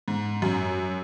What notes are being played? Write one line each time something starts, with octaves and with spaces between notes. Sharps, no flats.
G#2
F#2